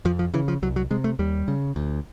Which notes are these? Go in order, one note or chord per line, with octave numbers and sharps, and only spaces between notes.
F2 F3
F3
C#3 E3
F3
C2 F#3
F#3
C3 G#3
A3
D#2 G3
C#3
D2